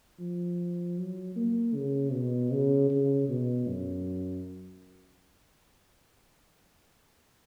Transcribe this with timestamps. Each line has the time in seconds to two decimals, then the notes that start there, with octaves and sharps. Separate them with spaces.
0.19 F3
0.98 F#3
1.36 A#3
1.74 C#3
2.13 B2
2.52 C#3
2.90 C#3
3.29 B2
3.67 F#2